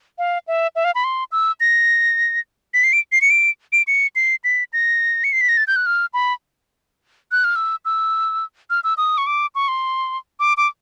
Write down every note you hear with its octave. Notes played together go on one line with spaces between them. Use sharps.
F5
E5
E5
F5
B5
C6
E6
A#6
B6
C7
D7
C7
C#7
D7
D7
C#7
C7
B6
A#6
C#7
C7
B6
A#6
A6
G6
F#6
F6
B5
F#6
F6
E6
E6
F6
E6
D#6
C#6
D6
C#6
C6
D6
D6